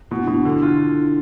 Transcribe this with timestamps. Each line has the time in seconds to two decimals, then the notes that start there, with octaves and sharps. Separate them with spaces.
0.11 B2 E4
0.22 D4
0.28 B2 E4
0.34 D4
0.45 D3 E4
0.62 F4